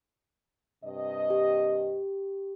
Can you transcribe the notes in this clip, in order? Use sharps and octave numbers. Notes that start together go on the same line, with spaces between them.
G2 C3 D#5
G4